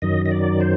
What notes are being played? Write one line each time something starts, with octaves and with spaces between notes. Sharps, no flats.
F#2 D#3 F#3 D#5
D#5
D5
C5